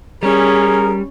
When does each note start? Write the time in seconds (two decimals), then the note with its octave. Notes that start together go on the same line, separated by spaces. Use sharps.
0.23 G3 C#4 G#4 A#4